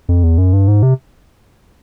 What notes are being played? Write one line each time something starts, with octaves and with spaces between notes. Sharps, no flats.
F2
E2
F#2
G2
G#2
C3